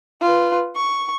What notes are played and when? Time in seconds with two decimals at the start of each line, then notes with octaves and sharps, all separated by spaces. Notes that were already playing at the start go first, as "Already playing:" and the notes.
0.21 F4 B4
0.76 C#6